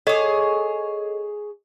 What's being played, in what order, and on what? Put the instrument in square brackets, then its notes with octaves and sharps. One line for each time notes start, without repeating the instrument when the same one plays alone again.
[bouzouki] G#4 C#5 [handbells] A4 D#5